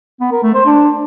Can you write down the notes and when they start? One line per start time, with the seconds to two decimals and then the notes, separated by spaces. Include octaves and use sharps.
0.20 B3
0.32 A#4
0.43 A3
0.54 C5
0.66 D4